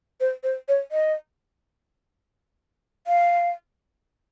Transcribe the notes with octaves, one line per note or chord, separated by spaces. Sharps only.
C5
C5
C#5
D#5
F5